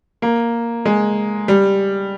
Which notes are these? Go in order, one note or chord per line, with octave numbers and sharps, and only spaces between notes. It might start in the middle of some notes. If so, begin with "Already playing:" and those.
A#3
G#3
G3